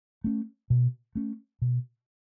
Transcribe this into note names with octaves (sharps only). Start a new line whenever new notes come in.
A3 C#4
B2
A3 C#4
B2